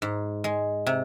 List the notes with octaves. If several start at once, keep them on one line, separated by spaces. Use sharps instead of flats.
G#2
G#3
C3